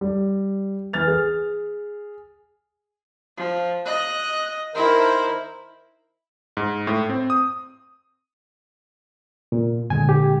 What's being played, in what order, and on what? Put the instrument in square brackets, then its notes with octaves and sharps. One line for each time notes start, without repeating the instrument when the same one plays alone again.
[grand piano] G3
E3 F6 A6 F7
G#4
[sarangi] F3
[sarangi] D#5 [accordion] F#6
[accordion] D#3 A#4 C5 [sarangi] E4
[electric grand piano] G#2
A2
C4
D#6
[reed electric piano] A#2
[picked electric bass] A#2 D3 G#3 [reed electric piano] G#5
[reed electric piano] G4